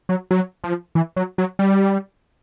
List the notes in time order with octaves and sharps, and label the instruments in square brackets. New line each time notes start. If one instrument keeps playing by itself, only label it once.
[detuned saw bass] F#3
F#3
F3
E3
F#3
F#3
G3